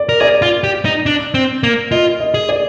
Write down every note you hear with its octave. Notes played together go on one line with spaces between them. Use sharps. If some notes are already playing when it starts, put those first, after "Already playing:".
Already playing: D5
A#4
G#4 D5
F4
G4
D#4
D4
C4
A#3
F4 D#5
D#5
G#4
D5